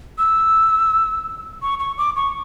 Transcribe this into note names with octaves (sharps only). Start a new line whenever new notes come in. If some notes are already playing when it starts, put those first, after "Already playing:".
E6
C#6
C#6
D6
C#6